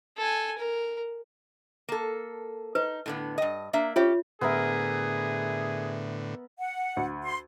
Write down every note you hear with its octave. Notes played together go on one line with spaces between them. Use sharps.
A4 G#5
A#4
A#3 A4
D#4 B4
A2 D3 B3
G2 D#5
A#3 D4 E5
C#4 F4 G4 C#5 E5
A2 D3 B3 G#4 A#4 E5
F#5
D2
C6